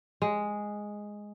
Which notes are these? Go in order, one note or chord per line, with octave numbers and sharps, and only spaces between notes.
G#3